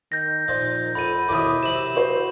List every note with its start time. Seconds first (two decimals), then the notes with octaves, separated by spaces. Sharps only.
0.12 D#3 G6 A#6
0.48 A#2 F3 D#4
0.95 F2 F#5 B5 D#7
1.28 D#2 B2 E3 E4 D6 D#6
1.63 C3 F#3 E7 F#7
1.95 F#4 C5